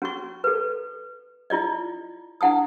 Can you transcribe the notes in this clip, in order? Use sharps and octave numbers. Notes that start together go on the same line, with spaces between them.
C#4 F#4 C#6
A4 B4
E4 F4 D5 D#5
D4 E4 F#5 A5 D#6